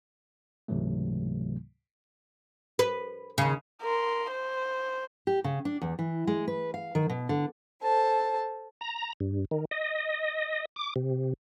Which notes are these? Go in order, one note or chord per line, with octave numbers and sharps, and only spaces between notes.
C#2 G#2 C3 E3 F#3 A3
B4
D#2 C#3
A#4 C6
C5
G4
C#3
D4
E2
E3
G#3
B4
F5
D#3
B2
D3
A4 C5 A5
A#5
G2
D#3
D#5
D6
C3